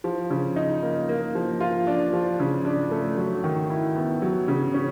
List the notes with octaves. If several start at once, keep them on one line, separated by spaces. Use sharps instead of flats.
F3
C#3
D#4
A#3
A#3
F3
F4
D4
F3
C#3
D4
A3
F#3
D#3
E4
B3
F#3
C#3
C#4